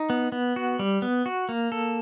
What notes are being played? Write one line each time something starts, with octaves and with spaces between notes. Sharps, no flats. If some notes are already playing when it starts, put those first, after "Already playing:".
Already playing: D#4
B3
B3
F#4
G3
B3
F#4
A#3
A4